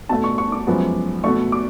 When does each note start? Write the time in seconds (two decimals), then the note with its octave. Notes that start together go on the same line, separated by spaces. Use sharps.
0.09 B2 A3 A5
0.24 C#6
0.38 C#6
0.52 D6
0.67 F#2 F3 G#3 B3
1.24 B2 A3 C#6
1.52 D6